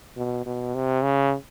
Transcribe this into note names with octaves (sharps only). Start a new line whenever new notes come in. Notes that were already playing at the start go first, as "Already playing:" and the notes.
B2
B2
C3
C#3